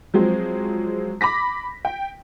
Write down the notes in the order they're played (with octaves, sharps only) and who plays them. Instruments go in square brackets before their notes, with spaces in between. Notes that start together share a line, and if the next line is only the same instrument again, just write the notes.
[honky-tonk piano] F3 F#3 G#3 C4
B5 D6 A#6 B6
G5